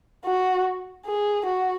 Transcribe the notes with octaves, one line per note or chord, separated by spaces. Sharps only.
F#4
G#4
F#4